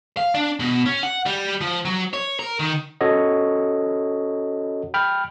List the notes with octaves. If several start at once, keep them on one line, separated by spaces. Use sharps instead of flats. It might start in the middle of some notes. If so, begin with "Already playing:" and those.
F5
D4
B2
C#4
F#5
G3
F3
F#3
C#5
A#4
D#3
C#4 F#4 A4 C#5 D#5
G5 B5 F6